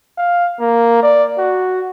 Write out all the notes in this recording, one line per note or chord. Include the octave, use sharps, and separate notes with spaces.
F5
A#3
D5
F#4